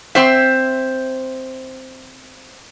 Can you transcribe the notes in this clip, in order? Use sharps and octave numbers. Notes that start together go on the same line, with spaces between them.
C4 C5 E5